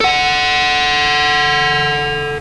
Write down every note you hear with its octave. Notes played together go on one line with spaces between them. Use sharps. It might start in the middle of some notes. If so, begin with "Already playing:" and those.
A4 F#5